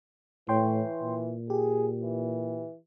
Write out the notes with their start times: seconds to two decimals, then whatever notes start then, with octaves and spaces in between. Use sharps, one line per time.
0.49 A2 E3 C#5 G5 C6
1.02 A#2
1.50 G4 G#4
2.03 E3